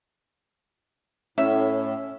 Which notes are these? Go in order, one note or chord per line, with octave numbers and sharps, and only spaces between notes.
A2 C#4 E5